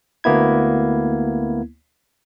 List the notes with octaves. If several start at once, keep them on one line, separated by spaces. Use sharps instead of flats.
D2 A#3 B3 E4 G#6